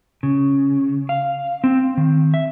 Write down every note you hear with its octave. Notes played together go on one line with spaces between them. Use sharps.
C#3
F5
C4
D#3
E5